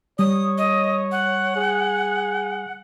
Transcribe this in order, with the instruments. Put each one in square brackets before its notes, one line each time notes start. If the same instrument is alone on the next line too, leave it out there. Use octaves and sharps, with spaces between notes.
[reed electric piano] G3 [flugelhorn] C#5 [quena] D#6
[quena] D#5
F#5
[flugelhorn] G#4